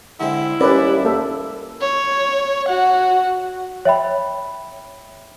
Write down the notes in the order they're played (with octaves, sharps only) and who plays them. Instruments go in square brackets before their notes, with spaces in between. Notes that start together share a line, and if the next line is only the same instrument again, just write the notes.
[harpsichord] D3 G#3 C4 [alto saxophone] E4
[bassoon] D#2 [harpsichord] G3 D4 [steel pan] C#4 B4 D5
[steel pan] A#3 A4 E5
[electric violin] C#5
F#4 F#5
[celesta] C#5 E5 G5 B5